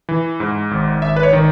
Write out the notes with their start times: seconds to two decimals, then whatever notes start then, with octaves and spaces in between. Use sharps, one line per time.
0.09 E3
0.40 G#2
0.71 G#1
1.02 G#1 E5
1.16 B4
1.23 C#5
1.33 D#3